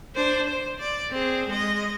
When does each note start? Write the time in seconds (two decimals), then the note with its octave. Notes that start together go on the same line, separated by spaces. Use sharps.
0.16 D4 C5
0.48 C5
0.79 D5
1.11 C4 G#4
1.49 G#3 D#5